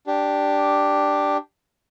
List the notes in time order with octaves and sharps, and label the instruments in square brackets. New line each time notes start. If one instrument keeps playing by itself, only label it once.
[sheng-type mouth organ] D4 G4